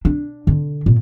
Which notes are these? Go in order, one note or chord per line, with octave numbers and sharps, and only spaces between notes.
D4
D3
A#2